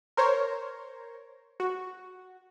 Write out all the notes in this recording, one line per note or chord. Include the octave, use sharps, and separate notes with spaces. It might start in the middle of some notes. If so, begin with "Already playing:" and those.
A#4 C5 C#5
F#4